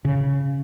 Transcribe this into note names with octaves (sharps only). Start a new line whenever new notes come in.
C#3